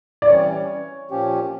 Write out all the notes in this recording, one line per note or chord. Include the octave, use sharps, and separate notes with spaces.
D5
E3 G3 C#4 C#5
A#2 F3 C#4 G4